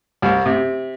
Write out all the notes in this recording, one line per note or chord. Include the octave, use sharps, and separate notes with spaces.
C2
C3